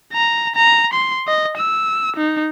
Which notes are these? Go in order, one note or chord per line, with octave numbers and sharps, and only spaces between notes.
A#5
A#5
C6
D#5
E6
D#4